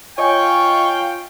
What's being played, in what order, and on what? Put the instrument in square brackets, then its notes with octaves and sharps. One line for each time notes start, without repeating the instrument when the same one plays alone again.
[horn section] F4 F5 G5 [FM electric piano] C#5 D#5 G#5 [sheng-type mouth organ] C#6